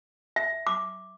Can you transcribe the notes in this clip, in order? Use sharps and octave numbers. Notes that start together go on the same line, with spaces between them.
E5
D6